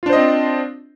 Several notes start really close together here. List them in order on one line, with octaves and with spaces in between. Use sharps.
F4 D4 C5 D#5 C4